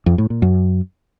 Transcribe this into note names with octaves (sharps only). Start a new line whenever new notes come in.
F2
A2
A#2
F#2